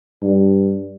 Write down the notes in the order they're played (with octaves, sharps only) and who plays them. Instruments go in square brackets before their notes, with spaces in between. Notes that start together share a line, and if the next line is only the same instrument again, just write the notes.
[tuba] G2